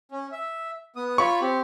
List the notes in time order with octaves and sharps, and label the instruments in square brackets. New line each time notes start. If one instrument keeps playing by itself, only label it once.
[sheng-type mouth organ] C#4
E5
B3 D#6
[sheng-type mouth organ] F4 C#5 B5 [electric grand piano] C#6
[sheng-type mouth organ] C4 G4